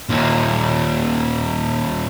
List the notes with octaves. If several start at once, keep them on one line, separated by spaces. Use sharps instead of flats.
D#2 A#2